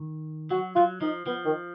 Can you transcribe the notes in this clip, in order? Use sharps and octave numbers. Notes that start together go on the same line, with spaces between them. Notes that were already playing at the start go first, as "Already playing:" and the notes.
Already playing: D#3
F#3 F#4
F#3 F4
F3 D#4
F3 B3
D#3